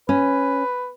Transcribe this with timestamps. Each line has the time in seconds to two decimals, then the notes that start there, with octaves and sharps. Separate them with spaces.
0.09 C#4 B4